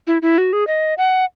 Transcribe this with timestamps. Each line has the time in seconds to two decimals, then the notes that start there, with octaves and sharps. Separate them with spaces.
0.07 E4
0.22 E4
0.38 F#4
0.53 G#4
0.67 D#5
0.98 F#5